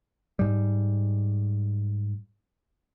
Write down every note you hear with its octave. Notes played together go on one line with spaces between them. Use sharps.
G#2 G3